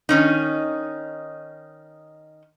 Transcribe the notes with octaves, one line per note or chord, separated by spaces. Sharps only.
D#3 C#4 D#4